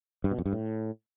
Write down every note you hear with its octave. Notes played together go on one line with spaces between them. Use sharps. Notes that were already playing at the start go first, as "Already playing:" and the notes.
G2
B2
F2
G2
A2